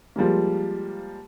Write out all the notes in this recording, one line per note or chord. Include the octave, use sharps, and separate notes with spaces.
F3 G3 G#3 A#3